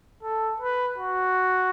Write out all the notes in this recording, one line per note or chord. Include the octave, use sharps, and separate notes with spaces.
A4
B4
F#4